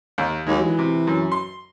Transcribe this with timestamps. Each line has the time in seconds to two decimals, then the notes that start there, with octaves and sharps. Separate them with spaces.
0.18 D#2
0.47 D#2 F#3 G#3
0.62 E3
0.79 C3
1.07 F#2
1.32 C6